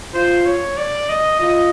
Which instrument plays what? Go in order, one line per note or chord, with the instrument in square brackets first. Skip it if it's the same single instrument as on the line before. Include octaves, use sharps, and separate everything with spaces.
[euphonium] F4 [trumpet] C5
[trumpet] C#5
D5
D#5
[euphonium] F4 [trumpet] D#5